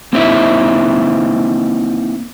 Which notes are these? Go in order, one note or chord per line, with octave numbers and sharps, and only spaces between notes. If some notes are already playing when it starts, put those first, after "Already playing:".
A#3 C4 D#4 E4 E5